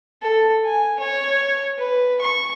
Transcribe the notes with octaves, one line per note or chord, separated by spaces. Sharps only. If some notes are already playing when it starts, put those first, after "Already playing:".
A4
G#5
C#5
B4
C#6